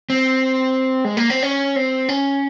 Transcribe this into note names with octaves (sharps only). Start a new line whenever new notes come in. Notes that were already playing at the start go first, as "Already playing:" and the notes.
C4
G#3
A#3
C4
C#4
C4
C#4